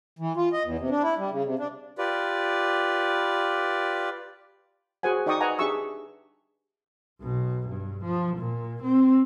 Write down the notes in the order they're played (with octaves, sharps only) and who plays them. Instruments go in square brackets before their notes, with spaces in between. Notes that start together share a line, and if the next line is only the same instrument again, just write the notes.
[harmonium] E3
F4
D#5
E2
C3
D4
E4
G3
C#3
C3
D4
[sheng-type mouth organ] F4 G4 B4 D5
[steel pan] F#4 G#4 C5 F#5 G#5
D#4 D5 D#5 G5 C#6 D#6
B4 D#5 F#5 G#5 A#5
D4 G4 G#4 E5 C#6 E6
[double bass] B1 B2
G2
F3
A#2
C4